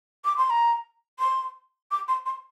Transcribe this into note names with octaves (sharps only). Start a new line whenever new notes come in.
D6
C6
A#5
C6
D6
C6
C6